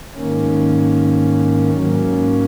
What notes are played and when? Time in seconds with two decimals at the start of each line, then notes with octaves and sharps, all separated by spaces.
0.15 G#2 D#3 A#3 C#4
1.74 G#2 F#3 A#3 C#4